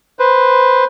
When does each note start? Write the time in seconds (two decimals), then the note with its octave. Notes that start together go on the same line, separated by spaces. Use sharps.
0.19 B4 C5